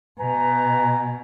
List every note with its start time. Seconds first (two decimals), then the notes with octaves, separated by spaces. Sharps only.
0.20 B2 B4 G#5 A#5